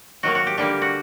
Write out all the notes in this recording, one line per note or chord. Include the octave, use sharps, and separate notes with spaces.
D#3 F#3 A#3 F#4
F#4
G4
D3 G3 A#3 G4
F#4